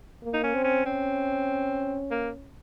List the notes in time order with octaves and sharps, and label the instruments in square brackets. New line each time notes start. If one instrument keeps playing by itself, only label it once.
[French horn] A#3
[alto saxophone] D#4
C#4
[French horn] C4
[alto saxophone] C#4
[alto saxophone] C4 [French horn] C#4
[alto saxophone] A#3